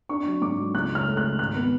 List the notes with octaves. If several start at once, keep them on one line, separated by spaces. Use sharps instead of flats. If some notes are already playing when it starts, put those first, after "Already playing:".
D4 C#6
F#3
G#2 D6
F#3
C#2 F#6
C#3 F6
A3
F#6
C#3
G#1 F#6
B3